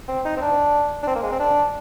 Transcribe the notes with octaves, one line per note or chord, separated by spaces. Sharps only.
C4
D#4
C4
D4
D4
C4
A#3
G#3
C4
D4